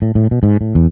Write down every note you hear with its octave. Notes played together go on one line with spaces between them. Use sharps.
A2
A2
B2
G#2
A2
E2